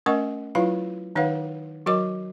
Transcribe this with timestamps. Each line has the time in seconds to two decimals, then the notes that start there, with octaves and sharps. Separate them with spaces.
0.06 A3 C#4 A#4 D#5 F#5 C#6
0.55 F#3 E4 F4 B4 F5 B5
1.15 D#3 D#4 B4 C#5 F5 F#5
1.86 F#3 F#4 A#4 D#5 D6